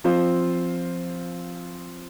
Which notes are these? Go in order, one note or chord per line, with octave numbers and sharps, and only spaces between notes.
F3 C4 F4 C5